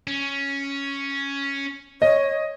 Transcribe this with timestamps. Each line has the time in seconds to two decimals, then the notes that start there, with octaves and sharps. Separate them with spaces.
0.07 C#4
2.02 C#5 D#5